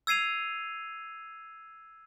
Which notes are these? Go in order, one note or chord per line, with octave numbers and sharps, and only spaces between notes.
E6 G#6 C7 D#7 F7